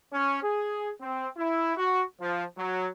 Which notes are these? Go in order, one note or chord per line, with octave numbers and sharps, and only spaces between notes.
C#4
G#4
C4
E4
F#4
F3
F#3